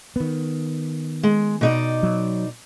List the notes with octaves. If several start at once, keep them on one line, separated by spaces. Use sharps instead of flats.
D#3 B3
G#3
B2 D#4 D5
F#3